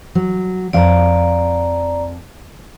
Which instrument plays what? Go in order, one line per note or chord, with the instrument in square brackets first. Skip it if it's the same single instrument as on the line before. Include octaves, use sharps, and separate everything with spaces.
[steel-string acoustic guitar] F#3
[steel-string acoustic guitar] F2 F5 [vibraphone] D5 A#5